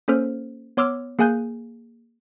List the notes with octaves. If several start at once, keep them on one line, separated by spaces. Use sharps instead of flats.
A#3 C#4 A4 C5 F6
B3 C#5 C6 D6 E6 F6
A#3 G#4 F5 G#5 F#6 G6